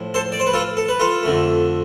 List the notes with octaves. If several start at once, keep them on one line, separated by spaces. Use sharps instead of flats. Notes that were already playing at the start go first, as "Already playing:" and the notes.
Already playing: A2 F3
A4 C5
D5
C5
B4
F4 A4
A4
B4
F4 A4
F2 D3 A3